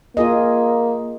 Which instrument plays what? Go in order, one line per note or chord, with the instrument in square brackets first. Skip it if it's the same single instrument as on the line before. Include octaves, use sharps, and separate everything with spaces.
[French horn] A#3 [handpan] F4 G#4 D#5